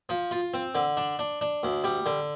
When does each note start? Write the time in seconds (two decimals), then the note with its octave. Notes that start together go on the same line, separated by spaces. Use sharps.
0.09 F3
0.31 F4
0.54 C4
0.75 D3
0.97 D4
1.19 D4
1.41 D4
1.63 D2
1.84 G3
2.06 D3